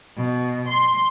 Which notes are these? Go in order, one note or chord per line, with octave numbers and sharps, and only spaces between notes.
B2
C6